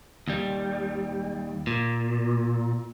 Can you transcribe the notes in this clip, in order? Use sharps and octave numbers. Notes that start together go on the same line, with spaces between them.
D#2 G3
A#2